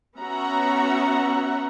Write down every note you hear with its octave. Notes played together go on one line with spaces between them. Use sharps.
B3 C#4 F#4 E5 F#5 A#5